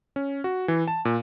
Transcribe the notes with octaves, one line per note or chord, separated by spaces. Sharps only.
C#4
F#4
E3
A5
A#2